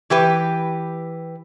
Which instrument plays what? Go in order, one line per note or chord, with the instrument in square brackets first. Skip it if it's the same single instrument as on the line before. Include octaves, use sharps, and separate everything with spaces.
[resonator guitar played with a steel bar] E3 G4 B4